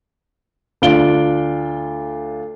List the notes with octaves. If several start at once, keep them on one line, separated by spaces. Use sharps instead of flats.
D2 D4 F4 D7 G7